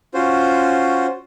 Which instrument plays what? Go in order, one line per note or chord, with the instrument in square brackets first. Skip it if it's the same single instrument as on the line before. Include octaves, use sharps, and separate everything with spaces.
[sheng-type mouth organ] C#4 F4 F#4 C5